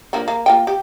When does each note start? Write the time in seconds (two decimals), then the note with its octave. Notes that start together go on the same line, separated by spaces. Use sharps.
0.13 D3 F3 A#3
0.28 A#3
0.46 A#3 F4 G5
0.67 G4